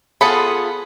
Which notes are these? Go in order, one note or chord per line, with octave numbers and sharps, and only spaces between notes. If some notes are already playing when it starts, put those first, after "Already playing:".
B3 F4 G#4 A4 B5